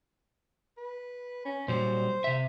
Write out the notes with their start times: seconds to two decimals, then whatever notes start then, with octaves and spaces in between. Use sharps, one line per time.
0.77 B4
1.45 C#4
1.68 A#2 F#3 G3 C5
2.24 C3 E5